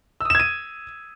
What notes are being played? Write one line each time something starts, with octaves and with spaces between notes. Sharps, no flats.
D#6 E6 G#6 D#7 E7